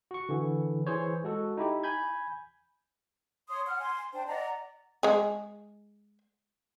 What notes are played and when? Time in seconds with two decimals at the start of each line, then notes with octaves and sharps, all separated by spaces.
0.11 F#4 C#6
0.29 D3 E3
0.87 E3 G#4 C5 C#5
1.24 G#3 F#4 A4
1.57 D#4 E4 G4
1.83 G#5 B5 G6 G#6
3.49 C#5 C6 D#6
3.66 F#5 F6
3.78 G#5 C6
4.13 D4 C5 G5 A5
4.27 D5 D#5 F#5 A#5
5.03 G#3 G#4